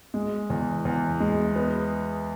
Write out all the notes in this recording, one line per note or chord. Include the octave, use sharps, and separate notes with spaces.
G#3
E2
E2
G#3
B3